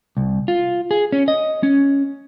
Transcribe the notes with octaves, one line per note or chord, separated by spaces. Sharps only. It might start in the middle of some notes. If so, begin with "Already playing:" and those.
C2
F4
G#4
C#4
D#5
C#4